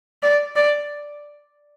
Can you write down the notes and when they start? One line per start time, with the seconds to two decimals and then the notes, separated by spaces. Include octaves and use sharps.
0.23 D5
0.56 D5